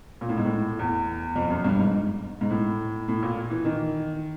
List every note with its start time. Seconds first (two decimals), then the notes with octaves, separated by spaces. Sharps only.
0.21 A#2
0.29 A2
0.38 G#2
0.45 A2
0.79 E2
1.36 F2
1.50 F#2
1.64 G2
1.79 G#2
2.41 G#2
2.50 A2
3.08 A2
3.23 A#2
3.50 E3
3.65 D#3